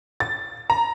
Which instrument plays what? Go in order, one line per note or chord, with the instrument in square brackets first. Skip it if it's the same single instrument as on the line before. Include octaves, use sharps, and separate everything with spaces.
[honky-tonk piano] A6
A#5